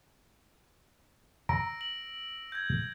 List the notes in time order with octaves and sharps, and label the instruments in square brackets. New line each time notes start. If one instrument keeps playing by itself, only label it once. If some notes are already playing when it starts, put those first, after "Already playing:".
[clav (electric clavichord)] A#5 [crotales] E6 A#6 D7
[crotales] F#7
G6 G#6